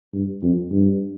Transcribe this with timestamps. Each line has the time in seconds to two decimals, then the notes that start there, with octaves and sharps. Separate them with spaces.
0.13 G2
0.42 F2
0.71 G2